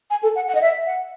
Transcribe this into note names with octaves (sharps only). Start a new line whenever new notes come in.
G#5
A4
F#5
F#5
D#5
E5
F#5